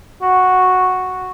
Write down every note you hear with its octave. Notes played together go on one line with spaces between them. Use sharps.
F#4